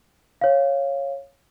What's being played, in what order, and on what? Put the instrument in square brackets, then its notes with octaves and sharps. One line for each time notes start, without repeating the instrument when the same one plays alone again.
[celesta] C#5 F5